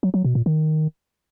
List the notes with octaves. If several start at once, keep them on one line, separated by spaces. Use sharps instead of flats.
F#3
F#3
B2
A#2
D#3